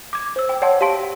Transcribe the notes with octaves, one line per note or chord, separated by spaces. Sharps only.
D6 G#6
C5 E6
G5
C#5 D5 F#5 G5 A5 C6
G4 F5 A5 C6 D7